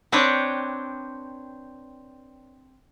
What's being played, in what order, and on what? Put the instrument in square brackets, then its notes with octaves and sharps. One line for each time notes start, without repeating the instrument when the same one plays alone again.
[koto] C4 D4 B4 C#5 D5 G5